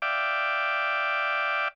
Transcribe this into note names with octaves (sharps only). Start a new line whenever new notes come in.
D5 E5 F5 G5 D6